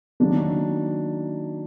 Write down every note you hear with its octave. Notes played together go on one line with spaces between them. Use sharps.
D#3 F#3 A#3 D4